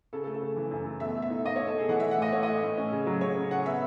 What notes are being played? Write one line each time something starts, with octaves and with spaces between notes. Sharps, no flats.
C#3 A4
A4
A3
A4
C#3
E3
F#2
A3
B2 E5
A3
E5
D#4
B2 D#5
B2 C#5
A4
A3 G#4
E3 F#5
A3 E5
F#5
A2 D#5
A3 C#5
D#5
A3
A2
C#4
C#3
F#3
C#3 C#5
C#3
C#4 F#5
B3 E5